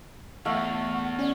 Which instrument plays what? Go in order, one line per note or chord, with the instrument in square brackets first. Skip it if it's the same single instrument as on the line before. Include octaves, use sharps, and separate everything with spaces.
[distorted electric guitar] E2 [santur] A3 F5 [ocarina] F#5
[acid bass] C#4 [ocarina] D5